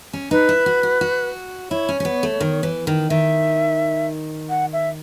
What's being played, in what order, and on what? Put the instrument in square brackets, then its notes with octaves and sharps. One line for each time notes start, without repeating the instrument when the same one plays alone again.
[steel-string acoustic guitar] C#4
[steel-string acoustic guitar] D#4 [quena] B4
[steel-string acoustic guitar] E4
F#4
F#4
F#4
[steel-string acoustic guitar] E4 [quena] C#5
[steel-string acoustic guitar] C#4
C#4
B3
A3
D#3
E3
D#3
[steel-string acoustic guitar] D#3 [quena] E5
[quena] F#5
E5